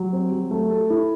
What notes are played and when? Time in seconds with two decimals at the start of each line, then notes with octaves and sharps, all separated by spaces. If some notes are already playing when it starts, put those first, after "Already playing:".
Already playing: F#3
0.13 C4
0.32 F#3
0.51 A3
0.71 A4
0.90 E4